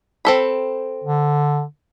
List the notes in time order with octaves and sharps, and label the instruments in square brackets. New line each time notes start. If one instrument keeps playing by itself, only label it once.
[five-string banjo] C4 A4 B5
[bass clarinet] D3